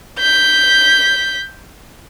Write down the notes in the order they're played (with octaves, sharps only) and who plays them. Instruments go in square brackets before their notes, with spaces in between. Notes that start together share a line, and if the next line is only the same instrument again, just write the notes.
[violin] G6 B6